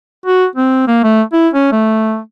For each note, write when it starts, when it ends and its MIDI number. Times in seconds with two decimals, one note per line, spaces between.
0.26 0.46 66
0.55 0.87 60
0.87 1.03 58
1.03 1.22 57
1.33 1.48 64
1.54 1.70 61
1.72 2.19 57